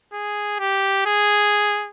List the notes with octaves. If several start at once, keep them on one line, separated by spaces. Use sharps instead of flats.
G#4
G4
G#4